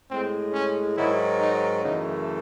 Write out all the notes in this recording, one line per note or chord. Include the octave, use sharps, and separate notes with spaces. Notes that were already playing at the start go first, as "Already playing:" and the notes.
A2 G#3 C4
C#4
G#2 D#3 F#3 E4
D#4
F#2 C#3 E3 A3 D#4